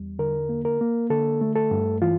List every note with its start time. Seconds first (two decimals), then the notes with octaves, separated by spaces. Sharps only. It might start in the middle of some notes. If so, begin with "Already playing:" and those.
Already playing: E2 G3
0.19 D3 A#4
0.49 A#3
0.65 A#4
0.81 A#3
1.10 D3 A4
1.41 A3
1.56 A4
1.71 G2
2.02 E3 F4